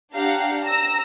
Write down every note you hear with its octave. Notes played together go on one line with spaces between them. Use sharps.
D4 G4 F5 F#5 A#5
A#5 E6 A#6